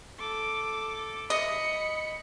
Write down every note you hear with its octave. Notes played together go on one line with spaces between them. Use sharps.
A4 D6
D#5 B5 C#7